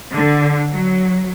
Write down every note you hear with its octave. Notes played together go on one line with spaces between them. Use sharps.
D3
F#3